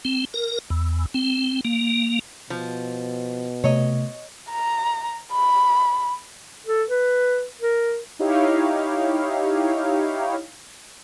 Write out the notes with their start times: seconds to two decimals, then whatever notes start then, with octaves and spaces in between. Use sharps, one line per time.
0.05 C4
0.34 A#4
0.70 E2
1.14 C4
1.65 A#3
2.50 B2 F3
3.64 C3 A3 C#5 D#5
4.51 A#5
5.33 B5
6.66 A4
6.90 B4
7.61 A#4
8.19 D#4 E4 G4 C#5 F5